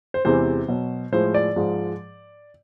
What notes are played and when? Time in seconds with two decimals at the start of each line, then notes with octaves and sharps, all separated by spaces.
0.14 C5
0.25 E2 C3 E3 G#3 C5
0.68 B2 F#3
1.12 A2 F3 G#3 C5
1.34 D5
1.56 G#2 F3 G#3